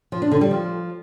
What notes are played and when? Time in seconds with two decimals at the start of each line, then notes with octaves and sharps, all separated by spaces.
0.12 F3
0.22 D4
0.31 D3
0.41 G3
0.51 F3